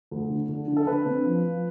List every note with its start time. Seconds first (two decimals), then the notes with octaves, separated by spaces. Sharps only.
0.11 D2
0.30 D3
0.49 D3
0.68 D3
0.77 A4
0.87 D3 B4
1.05 C4
1.24 F3
1.43 F3